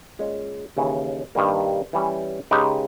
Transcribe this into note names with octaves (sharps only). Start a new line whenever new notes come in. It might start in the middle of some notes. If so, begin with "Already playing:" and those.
A#2 G#3 C#4
D#2 C#3 E3
G2 D#3 G3 A#3
E3 G3 C#4
C#3 G#3 D#4 G4 B4